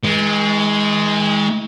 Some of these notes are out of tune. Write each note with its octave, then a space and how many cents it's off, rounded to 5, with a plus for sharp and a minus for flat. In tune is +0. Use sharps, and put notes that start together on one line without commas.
E3 -45 G#3 +0